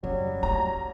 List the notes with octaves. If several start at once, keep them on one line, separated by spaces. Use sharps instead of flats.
F#2 F#3 G3
A3 A#5